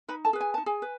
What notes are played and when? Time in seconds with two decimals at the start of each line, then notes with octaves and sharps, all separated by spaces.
0.08 D#4 B4 B5
0.25 A4 A5
0.33 G#4 B4
0.41 G#5
0.54 D#4 A5
0.66 G#4 G#5
0.82 B4